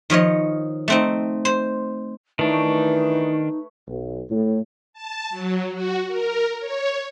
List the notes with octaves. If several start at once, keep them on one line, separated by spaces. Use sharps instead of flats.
D#3 F3 C#5 D#5
A3 C4 D#4
C5
D#3 E3 A3 D4 D#4 B4 C#5
B1
A2
A5
F#3
F#4
A#4
C#5